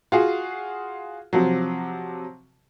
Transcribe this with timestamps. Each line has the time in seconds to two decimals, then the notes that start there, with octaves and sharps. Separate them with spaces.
0.12 F4 F#4 G#4
1.33 C3 F3 F#3